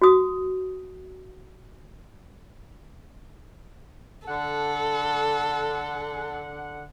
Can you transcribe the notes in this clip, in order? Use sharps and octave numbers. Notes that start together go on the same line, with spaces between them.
F#4 D#6
D3 A4 F#5